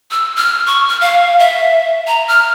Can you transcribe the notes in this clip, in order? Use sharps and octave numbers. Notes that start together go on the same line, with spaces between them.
E6
F6
C#6
F6
F5
E5
A#5
F6